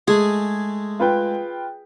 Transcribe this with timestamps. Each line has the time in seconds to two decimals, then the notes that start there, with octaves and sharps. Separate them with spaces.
0.08 G#3 A3 G#4
0.99 F4 B4 G5